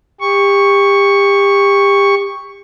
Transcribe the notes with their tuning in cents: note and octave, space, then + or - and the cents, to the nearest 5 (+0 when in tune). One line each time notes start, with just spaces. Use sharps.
G4 +30 C#6 +0